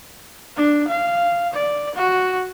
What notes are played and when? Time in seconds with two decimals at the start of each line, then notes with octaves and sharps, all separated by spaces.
0.57 D4
0.88 F5
1.54 D5
1.96 F#4